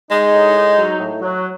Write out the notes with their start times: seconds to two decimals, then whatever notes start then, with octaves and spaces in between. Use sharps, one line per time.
0.10 G#3 D#4
0.33 A2
0.55 D#4
0.78 F#3
1.00 A2
1.22 F#3